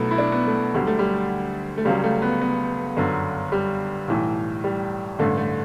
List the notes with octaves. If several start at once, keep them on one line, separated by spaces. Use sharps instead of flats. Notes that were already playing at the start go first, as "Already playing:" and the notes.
Already playing: B1 B2 F#3 A3 B3 E4
E4
D4
B3
A3
D2 D3 F#3 G3
A3
G3
A3
C#2 C#3 F#3 G3
A3
B3
B3
G1 F#2 D3 F#3
G3
B1 A2 E3
G3
A1 G2 D3 A3
A3